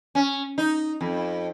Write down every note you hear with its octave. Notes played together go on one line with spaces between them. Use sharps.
C#4
D#4
F2